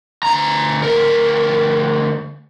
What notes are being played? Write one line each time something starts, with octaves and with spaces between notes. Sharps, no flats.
D2 A#5
D2 A#4